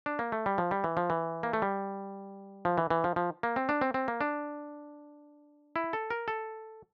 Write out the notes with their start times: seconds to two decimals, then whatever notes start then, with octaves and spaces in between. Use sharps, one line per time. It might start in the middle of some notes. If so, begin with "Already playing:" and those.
0.06 D4
0.19 A#3
0.32 A3
0.46 G3
0.58 F3
0.71 G3
0.84 E3
0.97 F3
1.10 E3
1.43 A#3
1.53 A3
1.62 G3
2.65 F3
2.78 E3
2.90 E3
3.04 F3
3.16 F3
3.43 A#3
3.56 C4
3.69 D4
3.81 C4
3.94 C4
4.08 A#3
4.21 D4
5.76 E4
5.93 A4
6.10 A#4
6.28 A4